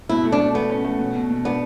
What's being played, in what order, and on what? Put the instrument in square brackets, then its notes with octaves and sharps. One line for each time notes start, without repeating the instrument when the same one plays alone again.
[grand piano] B2 [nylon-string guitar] E4
[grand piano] A3
[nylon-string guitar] D4
[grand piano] A3
[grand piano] A3 [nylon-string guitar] B3
[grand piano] C#4
A3
B2
B2
B2
[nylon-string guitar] B3 [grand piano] D4